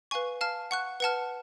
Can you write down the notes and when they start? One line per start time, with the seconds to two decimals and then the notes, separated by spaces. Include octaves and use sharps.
0.11 B4 F5 G#5 C#6
0.41 F5 A5 F6
0.71 F#5 C#6 F#6
1.00 B4 F#5 A5 F6